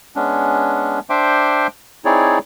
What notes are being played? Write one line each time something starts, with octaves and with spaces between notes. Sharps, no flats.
G#3 B3 C#4 D4
D4 C5 E5 G5 C6 D6
C4 D#4 E4 G#4 C#5 D5